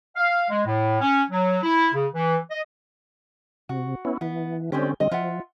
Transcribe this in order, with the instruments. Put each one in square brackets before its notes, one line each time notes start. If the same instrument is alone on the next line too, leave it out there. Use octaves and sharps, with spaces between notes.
[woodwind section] F5
G#3
A2
C#4
F#3
E4
C#3
E3
D#5
[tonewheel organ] C3 [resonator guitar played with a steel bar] F#4
[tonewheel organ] B3 C#4 E4
[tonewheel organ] E3 [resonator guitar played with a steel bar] B3
[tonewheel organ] D3 C4 C#4 [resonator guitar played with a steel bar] G3 G#3 G4
[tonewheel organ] D3 G3 C4 [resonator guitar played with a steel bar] D#5
[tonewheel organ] F3 [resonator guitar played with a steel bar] F4 E5 F#5